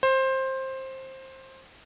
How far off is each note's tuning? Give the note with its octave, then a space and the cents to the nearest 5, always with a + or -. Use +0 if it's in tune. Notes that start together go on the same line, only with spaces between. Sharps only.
C5 +15